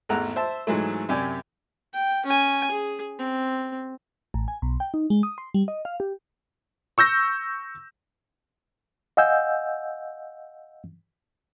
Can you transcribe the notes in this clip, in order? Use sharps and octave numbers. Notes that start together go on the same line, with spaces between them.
G#1 E2 A3 F#5 A#5
C5 E5 A5
G#2 E3 F#3 G#3 A3
F#2 C3 G4 D5 G#5
G5
C#4 G#5
G#4
C4
A1
G#5
B1
G5
D#4
G#3
D#6
C6
G3
D#5
F5
G4
C#6 E6 G6 A#6
D#5 F5 F#5 G#5 E6 G6